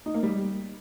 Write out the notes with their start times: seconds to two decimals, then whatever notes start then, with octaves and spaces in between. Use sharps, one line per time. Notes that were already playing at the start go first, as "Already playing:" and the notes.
0.06 D#4
0.14 A#3
0.23 G3